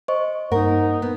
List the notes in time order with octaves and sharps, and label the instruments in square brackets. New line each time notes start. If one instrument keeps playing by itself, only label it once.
[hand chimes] C5 D#5 C#6
[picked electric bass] G2 A#3 [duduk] D#4 [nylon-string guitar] A#4 [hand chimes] F#5
[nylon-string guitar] B3